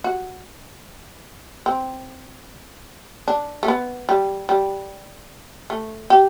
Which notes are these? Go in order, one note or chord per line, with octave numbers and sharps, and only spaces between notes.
F#4
C4
D4
A3
B3
G3
G3
A3
G4